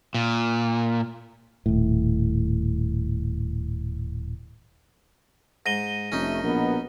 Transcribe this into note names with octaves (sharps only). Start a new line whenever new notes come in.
A#2
D#1 A2
G#2 A#6 D#7 G7
F1 A3 C#4 D#4
A#1 B2 B3 A#4